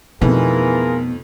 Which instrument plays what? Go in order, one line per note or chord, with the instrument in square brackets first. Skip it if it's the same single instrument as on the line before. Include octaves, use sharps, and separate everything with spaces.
[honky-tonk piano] F2 D#3 A3 [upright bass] B2 [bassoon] E3 [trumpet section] F4 G#4 A#4